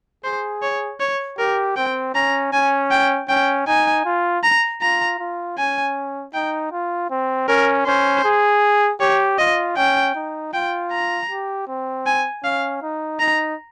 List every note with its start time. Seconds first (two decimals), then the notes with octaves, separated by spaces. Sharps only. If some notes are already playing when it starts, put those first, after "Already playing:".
0.24 G#4 C5
0.63 C#5
1.00 C#5
1.39 G4 A#4
1.77 C4 G5
2.14 C#4 A#5
2.53 C#4 G#5
2.91 G5
3.29 C#4 G5
3.67 D#4 G#5
4.05 F4
4.43 A#5
4.81 F4 A#5
5.19 F4
5.58 C#4 G#5
6.34 D#4 G5
6.72 F4
7.10 C4
7.48 C#4 A#4
7.86 C#4 C5
8.25 G#4
9.01 G4 C#5
9.38 F4 D#5
9.77 C#4 G5
10.15 D#4
10.53 F4 G5
10.91 A#5
11.30 G4
11.68 C4
12.06 G#5
12.44 C#4 F5
12.82 D#4
13.20 D#4 A#5